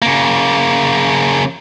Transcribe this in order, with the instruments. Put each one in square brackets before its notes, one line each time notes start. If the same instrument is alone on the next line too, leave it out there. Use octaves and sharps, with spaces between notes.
[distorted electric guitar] C#3 A#3